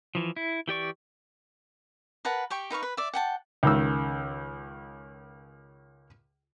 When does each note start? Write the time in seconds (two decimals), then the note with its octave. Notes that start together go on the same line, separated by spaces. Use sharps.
0.15 E3 F3
0.36 E4
0.68 E3 G4 D5 C#6
2.25 A#4 B4 F#5 A5
2.50 G4 G5 C#6
2.70 D#4 B4 F5 C#6
2.83 B4
2.97 D5 E5
3.14 F#5 G5 A5
3.63 C#2 D#3 E6